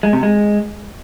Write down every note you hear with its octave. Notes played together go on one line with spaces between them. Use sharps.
G#3
C3
G#3